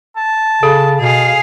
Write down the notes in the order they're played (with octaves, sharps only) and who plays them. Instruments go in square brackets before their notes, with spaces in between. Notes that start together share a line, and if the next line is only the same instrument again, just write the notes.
[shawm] A5
[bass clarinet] C#3 [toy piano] A4
[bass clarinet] B2 [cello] G#4 F5